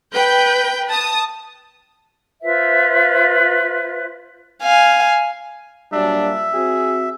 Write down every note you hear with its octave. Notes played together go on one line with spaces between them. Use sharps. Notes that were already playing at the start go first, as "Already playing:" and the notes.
B4 G5 G6
A5 D#6
F4 B4 C5 E5
F5 G#5
A#2 F#3 G3 D4 E5
C4 F#4 G#4